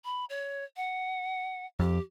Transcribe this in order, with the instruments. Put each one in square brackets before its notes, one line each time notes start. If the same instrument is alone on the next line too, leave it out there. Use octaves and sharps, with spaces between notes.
[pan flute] B5
C#5
F#5
[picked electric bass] F2 [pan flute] G4